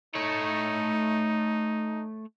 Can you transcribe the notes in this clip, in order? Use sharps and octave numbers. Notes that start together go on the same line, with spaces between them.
A3 D#4 C#5